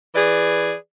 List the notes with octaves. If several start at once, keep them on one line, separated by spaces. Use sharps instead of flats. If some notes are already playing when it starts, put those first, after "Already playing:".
E3 G#4 B4 D5